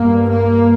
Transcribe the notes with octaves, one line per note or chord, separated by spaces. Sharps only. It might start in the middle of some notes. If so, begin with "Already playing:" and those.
Already playing: G2 A#3
A#3